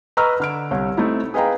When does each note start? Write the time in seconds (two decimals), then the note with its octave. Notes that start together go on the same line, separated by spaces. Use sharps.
0.17 B4 D#5 A#5 C#6 E6 F6
0.40 D3 F6 D7
0.71 C2 C#5
0.97 A3 C4 D#4 E4
1.34 G#4 B4 D#5 F5 G5 A#5